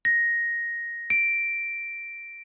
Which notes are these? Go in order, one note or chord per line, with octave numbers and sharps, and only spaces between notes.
A#6
D7